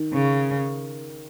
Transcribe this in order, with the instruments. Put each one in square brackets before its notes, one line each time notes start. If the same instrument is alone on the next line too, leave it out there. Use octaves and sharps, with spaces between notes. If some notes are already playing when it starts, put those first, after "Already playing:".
Already playing: [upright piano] D#3
[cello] C#3